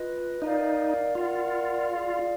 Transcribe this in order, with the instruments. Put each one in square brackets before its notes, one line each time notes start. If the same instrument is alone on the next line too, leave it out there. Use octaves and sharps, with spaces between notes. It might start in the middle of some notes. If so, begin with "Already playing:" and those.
Already playing: [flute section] F4 B4 D#5
[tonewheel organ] D#4 [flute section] A#4 D5 F5
[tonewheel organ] F4 [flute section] A#4 D5 F#5
[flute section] G#4 D5 F5